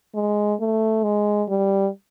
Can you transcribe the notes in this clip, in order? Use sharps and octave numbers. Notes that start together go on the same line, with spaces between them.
G#3
A3
G#3
G3